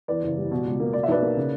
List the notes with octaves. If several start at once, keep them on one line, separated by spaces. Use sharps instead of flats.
E2 B4 D5
F#1
G3
B2
C#2
A#3
B2 D5
E5
B1 B4 D5
A#3
C#3